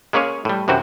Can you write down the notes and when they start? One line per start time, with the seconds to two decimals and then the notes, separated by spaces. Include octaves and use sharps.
0.13 G#3 A#3 C#4 G#4 C#5
0.45 A2 G3
0.68 F#2 C3 E3 C4 F#4